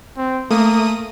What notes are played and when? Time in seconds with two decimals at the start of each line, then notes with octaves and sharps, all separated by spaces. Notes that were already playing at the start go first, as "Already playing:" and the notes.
0.17 C4
0.50 A3 A#3 D#6 D#7